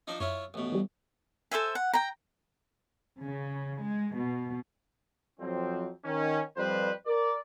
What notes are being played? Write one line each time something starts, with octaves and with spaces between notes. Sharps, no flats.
F3 D4 D#4
F#2 E4 F4 C#5
A1 B2
E3 G3
A4 C5 E5 G#5
F#5
G5 A#5
C#3
G#3
B2
F2 F#3 C4
D#3 C#4
F2 G3 B4 C5
A#4 D5